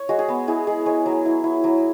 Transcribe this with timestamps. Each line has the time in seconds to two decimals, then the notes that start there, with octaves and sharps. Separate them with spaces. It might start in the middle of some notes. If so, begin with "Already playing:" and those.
Already playing: C#5
0.09 G#3 F#4
0.19 G#4
0.28 B3
0.47 E4 G#4
0.67 G#3 G#4
0.86 G#3 C#5
1.06 F#3
1.26 E4
1.44 E4
1.64 F#3